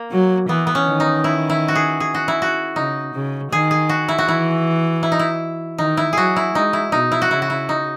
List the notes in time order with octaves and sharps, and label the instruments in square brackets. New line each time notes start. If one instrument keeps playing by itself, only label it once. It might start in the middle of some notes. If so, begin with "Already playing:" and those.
Already playing: [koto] A#3
[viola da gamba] F#3
[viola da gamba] E3 [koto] B3
[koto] B3
C#4
[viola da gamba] D#3
[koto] D#4
E4
E4
F#4
G#4
G#4
F#4
E4
F#4
[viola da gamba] C#3 [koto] D#4
[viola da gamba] C#3
[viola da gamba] D#3 [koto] G#4
[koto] G#4
F#4
E4
F#4
[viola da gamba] E3 [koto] E4
[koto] E4
D#4
E4
[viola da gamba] D#3 [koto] D#4
[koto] E4
[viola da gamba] F#3 [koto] F#4 G#4
[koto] E4
[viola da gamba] G#3 [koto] D#4
[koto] E4
[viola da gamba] B2 [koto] D#4
[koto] E4
F#4
[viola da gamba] C#3 [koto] E4
[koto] F#4
E4
D#4